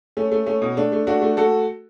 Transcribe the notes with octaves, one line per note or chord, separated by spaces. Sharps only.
A3 C#4
A3
A3 C#4
B2
A3 D4
A3
A3 D4 F#4
A3
A3 F#4 A4